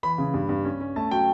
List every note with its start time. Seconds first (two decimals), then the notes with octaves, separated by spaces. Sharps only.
0.03 E3 B5
0.18 C#3
0.34 G2
0.49 G2
0.65 C#4
0.81 C#4
0.96 A3 A5
1.11 F#3 G5